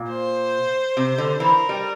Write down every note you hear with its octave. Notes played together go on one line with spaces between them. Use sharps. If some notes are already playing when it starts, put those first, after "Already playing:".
Already playing: A#2
C5
C3
D3
E3 A#4
G3